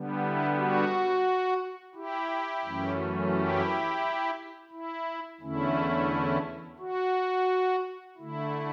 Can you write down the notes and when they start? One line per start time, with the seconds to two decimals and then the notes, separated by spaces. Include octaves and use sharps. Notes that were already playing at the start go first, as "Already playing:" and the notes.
Already playing: D3 G3 B3
0.22 E4
0.57 F#4
1.95 E4 G4
2.64 F#2 E3 A3 C#4
3.34 E4 G4
4.71 E4
5.41 E2 D3 A3 C#4 E4
6.79 F#4
8.17 D3 A3 E4